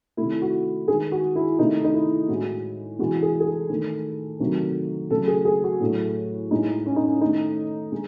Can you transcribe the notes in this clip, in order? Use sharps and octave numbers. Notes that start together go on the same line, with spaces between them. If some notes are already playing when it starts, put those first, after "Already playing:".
C3 D#3 A3 E4
F#4
D#3 G#3 G#4
F#4
E4
C3 D#3 A3 D#4
D#4
E4
A2 G#3 F#4
C3 E3 G#3 F#4
G#4
G#4
A4
D#3 A3
C3 D#3 F#3 A3
C#3 F#3 A3 A4
G#4
G#4
F#4
A2 F#3 A3
A2 G#3 D#4
C#4
D#4
C#4
D#3 A3 D#4
G#3